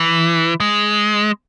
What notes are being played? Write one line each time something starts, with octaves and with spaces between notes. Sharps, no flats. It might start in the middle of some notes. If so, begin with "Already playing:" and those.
Already playing: E3
G#3